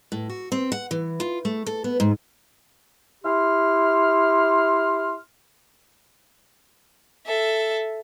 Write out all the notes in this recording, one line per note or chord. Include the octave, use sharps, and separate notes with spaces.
A2
F#4
C4
F#5
E3
F4
A3
A4
B3
G#2
E4 G4 C6 F6
A4 E5